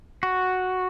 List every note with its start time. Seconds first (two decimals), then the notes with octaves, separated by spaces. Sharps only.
0.23 F#4